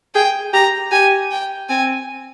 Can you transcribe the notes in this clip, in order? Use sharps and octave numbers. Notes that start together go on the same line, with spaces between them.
G#4 G5
G4 A#5
G4 G#5
G5
C4 G#5